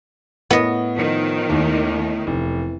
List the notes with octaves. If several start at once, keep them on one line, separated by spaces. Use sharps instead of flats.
A2 B3 D#5
D#3 F3
D#2 A2
F1 E3